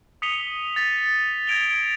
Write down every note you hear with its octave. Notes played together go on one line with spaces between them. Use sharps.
D#6 B6 C#7 D#7 F7 G7
A6 B6
G#6 A#6 D7 F7 G7